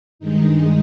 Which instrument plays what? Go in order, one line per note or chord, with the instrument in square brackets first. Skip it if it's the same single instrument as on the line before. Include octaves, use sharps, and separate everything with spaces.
[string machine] G2 D#3 G#3 D#4